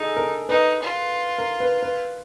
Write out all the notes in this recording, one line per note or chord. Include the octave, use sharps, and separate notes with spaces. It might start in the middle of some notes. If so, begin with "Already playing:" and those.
Already playing: D#4 G#4 A4
A#4
D#4 B4
F4
A#4
B4
B4